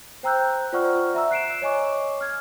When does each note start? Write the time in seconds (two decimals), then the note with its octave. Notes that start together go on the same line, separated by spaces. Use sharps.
0.23 C5 G5 A#5 E6 F#6 G6
0.73 F4 C5 D5 F#5 C#6 F6
1.14 E5 A#5 E6
1.31 F#6 C7 D7 E7
1.62 C#5 D#5 G#5 C#6 D6
2.21 F6 G#6